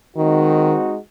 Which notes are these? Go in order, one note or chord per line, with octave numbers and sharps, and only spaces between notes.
D#3 G#3 C4 D#4 F#4